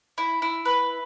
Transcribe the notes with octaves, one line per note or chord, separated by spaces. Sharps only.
E4
E4
B4